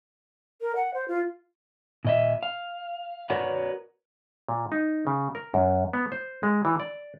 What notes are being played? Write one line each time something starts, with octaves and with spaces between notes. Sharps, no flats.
A#4
F#5
C5
F4
A#2 D#5 E5
F5
F#4 A#4 B4 C#5 D5 F#5
A#2
D#4
C#3
A#4
F#2
B3
C5
G#3
E3
D5